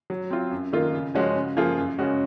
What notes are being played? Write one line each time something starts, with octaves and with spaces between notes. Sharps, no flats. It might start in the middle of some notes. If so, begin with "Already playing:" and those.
F#3
C4 F4
F#2
D#3 A#3 F4
C#3
F3 G#3 C#4 F#4
C#3
F3 A#3 F4 G#4
F#2
C#3 G#3 C#4 F#4